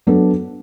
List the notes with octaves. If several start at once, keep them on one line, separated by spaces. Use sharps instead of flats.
F#3 B3 D4 A4